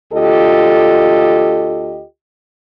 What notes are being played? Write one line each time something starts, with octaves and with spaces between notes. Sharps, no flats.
D2 F4 G4 A4 D#5